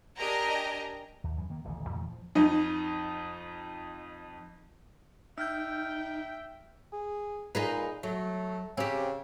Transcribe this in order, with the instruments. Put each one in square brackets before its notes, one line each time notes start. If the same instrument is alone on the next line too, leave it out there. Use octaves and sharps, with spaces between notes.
[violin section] D4 G4 A#4 D#5 G#5 A#5
[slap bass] D#2
F#2 E3
D#3 A#3
D#1 A1 D3 E3
E2 A#2 D#3 A3
F3
[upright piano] F2 D#4
[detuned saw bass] D#4 [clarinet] E5 [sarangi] G5 [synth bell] E6 F6 G6
[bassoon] G#4
[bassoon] A#2 [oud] D#4 G#4 B4
[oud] F#3 [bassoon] A3
[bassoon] C#3 [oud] C4 G4